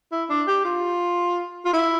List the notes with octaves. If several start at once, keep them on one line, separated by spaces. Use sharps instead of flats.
E4
D4
G4
F4
F4
E4